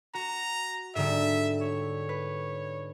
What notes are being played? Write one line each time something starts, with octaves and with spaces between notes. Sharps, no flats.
F#4 A#5
G#2 D3 G3 E5
C#5
B4